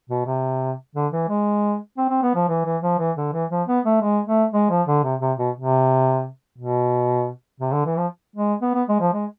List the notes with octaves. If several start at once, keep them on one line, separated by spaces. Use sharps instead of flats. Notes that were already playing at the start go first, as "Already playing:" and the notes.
B2
C3
D3
E3
G#3
C4
C4
B3
F3
E3
E3
F3
E3
D3
E3
F3
B3
A3
G#3
A3
G#3
F3
D3
C3
C3
B2
C3
B2
C3
D3
E3
F3
G#3
B3
B3
G#3
F3
G#3